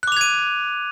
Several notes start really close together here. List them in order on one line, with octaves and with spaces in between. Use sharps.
F#6 D6 F7 G#6 D#7